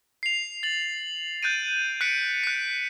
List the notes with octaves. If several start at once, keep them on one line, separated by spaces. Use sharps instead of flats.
C7 F7
A6 F#7
F#6 G6 A6 D7 D#7
F#6 B6 C#7 D7
F#6 B6